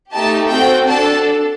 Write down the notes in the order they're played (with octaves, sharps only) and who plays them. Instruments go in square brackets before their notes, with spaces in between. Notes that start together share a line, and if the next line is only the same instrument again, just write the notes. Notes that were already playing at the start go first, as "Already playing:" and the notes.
[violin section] A3 D#4 G4 A5
C4 F#4 A4 G5
D4 A4 A5